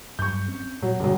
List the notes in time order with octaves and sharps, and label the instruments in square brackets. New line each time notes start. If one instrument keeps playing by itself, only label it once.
[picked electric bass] G2 F#3 [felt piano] C#6 G6
[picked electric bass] C4 C#4
[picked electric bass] A#2 [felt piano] F#3
[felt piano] E1 F#3 [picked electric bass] G2 D3